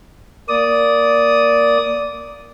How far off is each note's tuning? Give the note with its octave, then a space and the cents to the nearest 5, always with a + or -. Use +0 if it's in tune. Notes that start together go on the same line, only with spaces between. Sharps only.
A#3 +0 D5 -10 D#6 +0